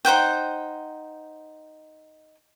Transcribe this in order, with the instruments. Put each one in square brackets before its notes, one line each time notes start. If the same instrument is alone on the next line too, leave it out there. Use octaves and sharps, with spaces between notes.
[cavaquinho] D#4 C5 F#5 G5